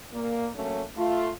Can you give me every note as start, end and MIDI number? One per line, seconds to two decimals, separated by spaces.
0.12 0.48 46
0.12 0.48 58
0.55 0.82 54
0.55 0.82 57
0.55 0.82 58
0.55 0.82 61
0.97 1.30 57
0.97 1.30 65